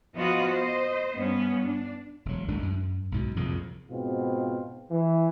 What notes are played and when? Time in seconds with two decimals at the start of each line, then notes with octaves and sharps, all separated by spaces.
0.15 F3 B3 F4 F#4 D#5
0.52 C5 D#5
1.15 G2 B3 C#4
1.62 D4
2.25 E1 F#3
2.48 G#1 A2 G#3 D4
2.62 F#2
3.12 B1 G#2 B2
3.36 C2 F2 A#2 C#3
3.91 G#2 B2 C4 F4
4.91 E3